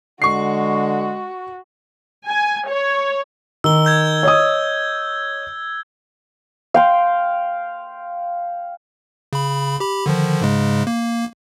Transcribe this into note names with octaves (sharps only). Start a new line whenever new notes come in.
D3 G#3 F#4 C#6 C7
G#5
C#5
D#3 E6 G7
E6 G6 G#6
C#5 D#5 D#6
F5 G5 C6
C#3 B5
G4 B5
D3 D#3 F3
G#2 C#3 G#3
A#3